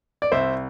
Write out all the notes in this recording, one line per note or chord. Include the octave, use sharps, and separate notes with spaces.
D5
C2 C5 E5